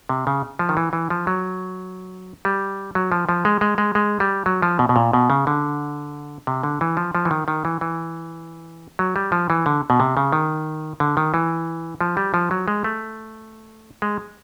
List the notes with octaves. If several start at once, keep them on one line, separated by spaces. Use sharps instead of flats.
C3
C#3
F3
D#3
E3
E3
F3
F#3
G3
F#3
F3
F3
G#3
G#3
G#3
G#3
G3
F#3
F3
B2
B2
A#2
B2
C#3
D3
C3
D3
E3
F3
F3
E3
D#3
D#3
E3
E3
F#3
G3
F3
E3
D3
B2
C3
C#3
D#3
D3
D#3
E3
F3
G3
F3
F#3
G#3
A3
G#3